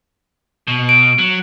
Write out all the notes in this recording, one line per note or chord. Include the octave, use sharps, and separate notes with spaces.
B2
D7
F#3